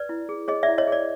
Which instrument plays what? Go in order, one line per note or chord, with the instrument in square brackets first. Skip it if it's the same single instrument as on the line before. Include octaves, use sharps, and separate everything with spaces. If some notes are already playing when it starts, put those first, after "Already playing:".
Already playing: [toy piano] B4 D5
E4
G#4
G#4 C#5 D#5
D5 E5
E4
C#5 D#5
G#4 D5